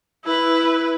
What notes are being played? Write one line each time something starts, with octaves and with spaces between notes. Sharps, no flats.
E4 B4